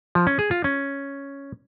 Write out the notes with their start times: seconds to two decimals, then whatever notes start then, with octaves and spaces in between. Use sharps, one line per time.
0.15 F3
0.27 C#4
0.39 G#4
0.51 F4
0.64 C#4